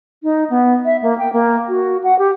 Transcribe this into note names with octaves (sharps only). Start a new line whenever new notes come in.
D#4
B3
E5
A#3
G5
A#3
F#4
F#5
G4